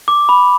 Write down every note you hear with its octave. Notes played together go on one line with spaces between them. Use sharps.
D6
B5